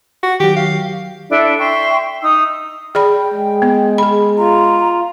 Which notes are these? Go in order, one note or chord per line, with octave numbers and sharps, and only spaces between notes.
F#4
D#3 F#3 G4
F5
D4 E4 A4 E5
E5 G5 C6 C#6
D#4 D#6 E6
G#4 D5 G5 B5
G#3
B3
G#4 B5
F4 A#5